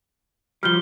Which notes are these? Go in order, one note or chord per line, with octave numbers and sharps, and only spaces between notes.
F3 G3 F6 G6 G7